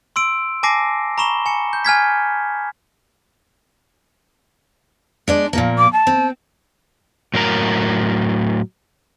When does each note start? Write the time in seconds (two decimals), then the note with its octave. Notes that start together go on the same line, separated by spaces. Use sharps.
0.16 C6 E6 D7
0.63 G#5 A5 D6 A#6 C7 D7
1.18 A#5 B5 C#6 E7 G7
1.46 G#5 C#7
1.73 G6
1.85 G#5 F6 G#6 B6
5.28 G#3 D4 D5
5.53 A#2 F3 A#3
5.78 D6
5.93 A5
6.07 C4
7.34 A2 F#3 A#4 A#5